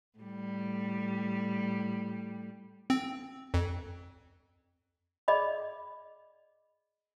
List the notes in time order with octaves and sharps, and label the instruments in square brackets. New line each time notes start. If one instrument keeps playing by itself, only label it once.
[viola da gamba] A2 G3
[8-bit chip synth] C4
F2
[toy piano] G#4 D5 D#5 B5